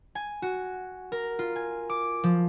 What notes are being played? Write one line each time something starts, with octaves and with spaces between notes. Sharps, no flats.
G#5
F#4
A#4
F4
G#5
D6
F3